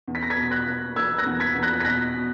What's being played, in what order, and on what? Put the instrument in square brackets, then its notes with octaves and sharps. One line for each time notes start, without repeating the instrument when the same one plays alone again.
[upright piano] E2
[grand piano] B6
A#6
G#6 B6
[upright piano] B2
[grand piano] F#6 A#6
[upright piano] A#3
[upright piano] A#3 [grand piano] E6 G#6
[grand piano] F#6 A#6
[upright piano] E2
[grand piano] G#6 B6
[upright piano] E2
[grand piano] F#6 A#6
B6
[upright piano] B2 [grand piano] F#6 A#6
[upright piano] B2